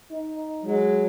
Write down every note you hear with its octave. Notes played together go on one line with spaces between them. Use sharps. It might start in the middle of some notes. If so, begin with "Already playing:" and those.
D#4
F#3 G#3